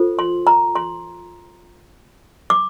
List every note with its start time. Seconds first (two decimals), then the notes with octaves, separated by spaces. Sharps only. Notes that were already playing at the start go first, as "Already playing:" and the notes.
Already playing: F4 A4 C5
0.19 C6
0.47 A#5
0.75 C6
2.50 D6